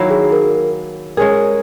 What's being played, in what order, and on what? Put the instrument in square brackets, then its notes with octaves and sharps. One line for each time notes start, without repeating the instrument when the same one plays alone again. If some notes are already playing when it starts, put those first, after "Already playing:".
Already playing: [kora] D#3 F#3 A#3 E4
[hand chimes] G#4
A#4
[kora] G#3 C#4 G#4 [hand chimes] A#4